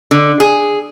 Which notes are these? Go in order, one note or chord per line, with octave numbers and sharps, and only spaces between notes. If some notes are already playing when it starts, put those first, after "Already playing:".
D3
G#4